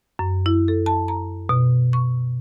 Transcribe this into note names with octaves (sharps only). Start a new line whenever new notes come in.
F#2
E4
A4
A5
A#5
B2
C#6